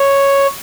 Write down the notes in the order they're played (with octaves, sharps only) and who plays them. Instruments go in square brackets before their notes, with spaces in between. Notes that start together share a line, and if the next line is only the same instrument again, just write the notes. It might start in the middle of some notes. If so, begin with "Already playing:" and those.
Already playing: [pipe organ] C#5